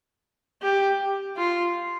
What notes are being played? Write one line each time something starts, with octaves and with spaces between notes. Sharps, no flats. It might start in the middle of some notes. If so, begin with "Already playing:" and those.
G4
F4